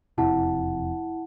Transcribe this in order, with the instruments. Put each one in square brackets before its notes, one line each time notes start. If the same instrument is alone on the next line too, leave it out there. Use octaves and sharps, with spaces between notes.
[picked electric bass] E1 F2 C3 [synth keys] E4 [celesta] F#5 A5